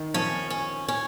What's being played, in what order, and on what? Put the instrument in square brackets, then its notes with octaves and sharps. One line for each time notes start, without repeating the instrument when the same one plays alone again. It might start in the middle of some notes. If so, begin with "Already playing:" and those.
Already playing: [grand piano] D#3
[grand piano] F3 [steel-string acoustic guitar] C#4
[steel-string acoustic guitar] C#4
C#4